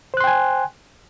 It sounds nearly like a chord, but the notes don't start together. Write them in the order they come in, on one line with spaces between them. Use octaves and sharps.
C5 F#6 C6 G5 G#5